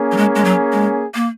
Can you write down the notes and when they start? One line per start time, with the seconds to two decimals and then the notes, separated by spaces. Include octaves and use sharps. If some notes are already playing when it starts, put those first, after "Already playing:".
Already playing: A#3 C#4 G#4
0.12 F#3
0.17 G#3
0.35 G#3
0.45 F#3
0.72 G#3
1.15 A#3